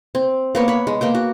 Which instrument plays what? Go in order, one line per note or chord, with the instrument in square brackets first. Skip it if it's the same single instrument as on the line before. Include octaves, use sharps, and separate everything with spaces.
[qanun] C4
A#3 B3 C#5
C#5 B5
G#3
A#3 B3 G5
F#4